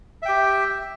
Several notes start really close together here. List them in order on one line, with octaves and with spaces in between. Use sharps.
E5 G5 G4